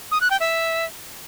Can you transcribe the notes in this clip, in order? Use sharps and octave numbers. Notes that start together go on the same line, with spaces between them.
D#6
F#6
G5
E5